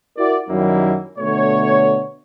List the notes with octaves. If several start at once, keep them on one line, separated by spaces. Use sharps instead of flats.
E4 F#4 A#4 D5
F#2 D#3 F#3 G3 A#3 E4
B2 D3 A3 C#5